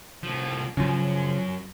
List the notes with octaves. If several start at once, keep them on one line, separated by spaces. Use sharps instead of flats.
C2 F3
F#2 C#3 F3